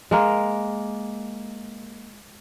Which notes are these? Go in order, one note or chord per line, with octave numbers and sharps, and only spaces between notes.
G#3 A#3 A#4